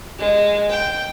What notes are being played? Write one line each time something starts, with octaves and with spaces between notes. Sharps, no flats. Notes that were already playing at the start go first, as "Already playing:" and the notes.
G#3
G5